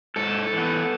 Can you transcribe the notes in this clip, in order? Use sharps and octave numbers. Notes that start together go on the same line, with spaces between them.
G#2 A4
E3 B3